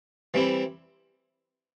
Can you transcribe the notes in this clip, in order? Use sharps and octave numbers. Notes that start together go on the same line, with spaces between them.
E3 G3 C4 E4